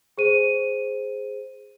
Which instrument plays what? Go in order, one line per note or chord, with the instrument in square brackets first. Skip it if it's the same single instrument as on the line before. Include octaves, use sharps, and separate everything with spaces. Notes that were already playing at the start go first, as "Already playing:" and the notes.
[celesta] G#4 C5 D#7